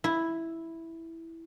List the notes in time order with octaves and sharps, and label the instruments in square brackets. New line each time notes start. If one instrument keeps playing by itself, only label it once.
[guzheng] E4